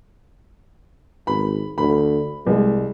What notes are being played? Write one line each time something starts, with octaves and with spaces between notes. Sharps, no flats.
G#1 B5
D2 B5
C2 G#3